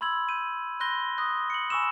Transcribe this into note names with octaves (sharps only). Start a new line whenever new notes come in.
B5 C6 E6 G#6 F#7
G6 D#7
B5 C6 F#6 G6 A#6 G7
C6 D#6 F#6 A#6
C#7 F#7
G#5 B5 C#6 E6 E7